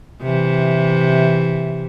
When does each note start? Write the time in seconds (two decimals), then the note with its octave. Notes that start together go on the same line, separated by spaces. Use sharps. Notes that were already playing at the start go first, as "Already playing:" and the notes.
0.22 C3 E3